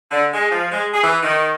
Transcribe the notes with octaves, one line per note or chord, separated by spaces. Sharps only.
D3
G#3
F3
G#3
G#4
E3
D#3